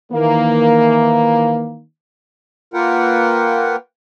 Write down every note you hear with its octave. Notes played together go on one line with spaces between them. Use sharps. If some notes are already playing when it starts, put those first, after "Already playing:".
D#3 E3 A#3
A#3 F4 A#4 B4 F#5 G5